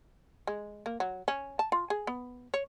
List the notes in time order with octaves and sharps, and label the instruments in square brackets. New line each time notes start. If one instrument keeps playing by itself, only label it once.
[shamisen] G#3
A#3
F#3
C#4
A5
F4
G#4
B3
C#5